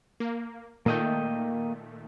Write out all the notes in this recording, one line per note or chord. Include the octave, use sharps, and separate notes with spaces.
A#3
A#2 D#3 A3 A#3 D#5 G5